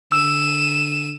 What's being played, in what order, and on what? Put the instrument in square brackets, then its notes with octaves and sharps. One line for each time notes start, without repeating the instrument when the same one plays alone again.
[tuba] D3 [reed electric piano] E6 [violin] D#7 E7